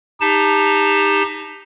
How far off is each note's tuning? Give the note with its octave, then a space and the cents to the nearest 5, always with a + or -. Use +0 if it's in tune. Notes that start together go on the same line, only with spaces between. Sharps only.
D#4 +0 G4 +30 A5 +0